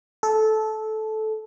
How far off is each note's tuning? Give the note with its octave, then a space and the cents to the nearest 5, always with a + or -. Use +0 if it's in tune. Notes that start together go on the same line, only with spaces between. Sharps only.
A4 -15